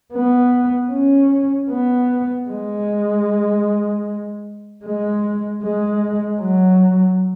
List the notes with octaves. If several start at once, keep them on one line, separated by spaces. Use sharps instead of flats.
B3
C#4
B3
G#3
G#3
G#3
F#3